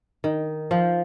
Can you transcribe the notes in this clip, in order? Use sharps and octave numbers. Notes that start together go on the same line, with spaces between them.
D#3
F3